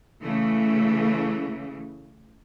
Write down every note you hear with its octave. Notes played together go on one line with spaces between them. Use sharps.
C#3 E3 A3